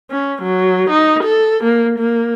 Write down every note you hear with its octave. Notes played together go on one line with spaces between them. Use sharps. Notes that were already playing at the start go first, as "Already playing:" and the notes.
C#4
F#3
D#4
A4
A#3
A#3